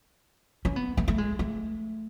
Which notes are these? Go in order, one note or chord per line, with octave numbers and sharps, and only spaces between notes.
C#4
B3
A3
A3
G#3
A3